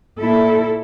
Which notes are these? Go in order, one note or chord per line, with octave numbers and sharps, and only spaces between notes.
A#2 E4 A4